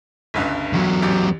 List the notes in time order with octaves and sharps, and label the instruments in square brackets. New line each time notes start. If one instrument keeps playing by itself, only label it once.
[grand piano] G1 C#2 G2
[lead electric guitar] E2 F#3
[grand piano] A1 G4